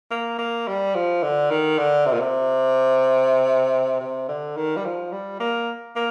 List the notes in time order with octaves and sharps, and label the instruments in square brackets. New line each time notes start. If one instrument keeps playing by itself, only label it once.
[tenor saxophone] A#3
A#3
G3
F3
D3
D#3
D3
C3
A#2
C3
C3
D3
D#3
G3
F3
G3
A#3
A#3